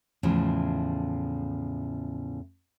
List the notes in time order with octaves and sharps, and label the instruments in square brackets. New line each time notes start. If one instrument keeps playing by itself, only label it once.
[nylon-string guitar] E2 A2 C#3 F3